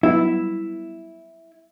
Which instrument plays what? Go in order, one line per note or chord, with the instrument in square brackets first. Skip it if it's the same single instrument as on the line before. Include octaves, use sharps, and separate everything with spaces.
[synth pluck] F#3 G3 B3 [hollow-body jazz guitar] E4